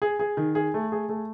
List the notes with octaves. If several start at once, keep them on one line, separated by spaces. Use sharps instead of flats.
G#4
G#4
D#3
G#4
A3
G#4
A3